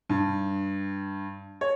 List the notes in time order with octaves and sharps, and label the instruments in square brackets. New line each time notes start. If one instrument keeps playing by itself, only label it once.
[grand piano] G2
C#5